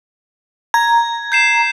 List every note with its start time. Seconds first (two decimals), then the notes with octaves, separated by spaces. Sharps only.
0.74 A#5 G#6
1.32 G6 C7 E7